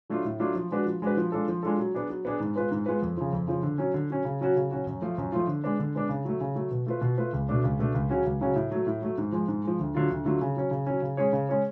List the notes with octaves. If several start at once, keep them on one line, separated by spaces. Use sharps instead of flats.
F#3 A3 D4 F4
A2
F#3 A3 D4 F4
F3
G#3 D4 F#4 B4
F3
G#3 D4 F#4 B4
F3
G#3 D4 F4 A4
F3
G#3 D4 F4 A4
F#3
B3 D4 G#4
F#3
B3 D4 G#4
G#2
G#3 B3 F4 B4
G#2
G#3 B3 F4 B4
F2
C#3 F3
F2
C#3 F3
D3
F#3 C#4
D3
F#3 C#4
C#3
F#3 C#4 F#4
C#3
F#3 C#4 F#4
F#2
F3 A3 F4
F#2
F3 A3 F4
D3
G#3 B3 D4
D3
G#3 B3 D4
C#3
F#3 A3
C#3
F#3 A3
B2
A3 F4 B4
B2
A3 F4 B4
C#2
B2 A3 D4
C#2
B2 A3 D4
C#2
C#3 F#3 C#4 F#4
C#2
C#3 F#3 C#4 F#4
A2
F#3 A3
A2
F#3 A3
G#2
F3 G#3
G#2
F3 G#3
D2
D3 F#3 A3 F4
D2
D3 F#3 A3 F4
C#3
F#3 C#4
C#3
F#3 C#4
C#3
G#3 C#4 G#4 C#5
C#3
G#3 C#4 G#4 C#5